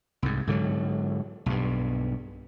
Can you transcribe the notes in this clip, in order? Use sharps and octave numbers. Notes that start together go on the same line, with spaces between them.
C2 G#2
G#2 D3 D#3 F#3
B1 G2